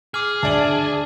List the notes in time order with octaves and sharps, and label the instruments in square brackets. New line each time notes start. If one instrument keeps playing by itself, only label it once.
[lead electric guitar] G#4 [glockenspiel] D6 F6
[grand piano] D2 F#7 [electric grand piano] D5 E5 A5